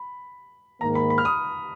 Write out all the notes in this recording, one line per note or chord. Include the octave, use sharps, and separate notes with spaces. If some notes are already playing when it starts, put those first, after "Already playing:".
Already playing: B5
G#2 D#3 A#3 A#5
B5
B5
F6
D#6